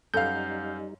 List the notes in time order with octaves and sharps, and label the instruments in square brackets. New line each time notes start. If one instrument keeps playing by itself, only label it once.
[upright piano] F#2 F5 [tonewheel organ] G3 D#4 [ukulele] A4 B4 F#5 [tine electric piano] G6